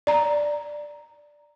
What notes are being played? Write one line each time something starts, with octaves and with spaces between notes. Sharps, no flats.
D5 A#5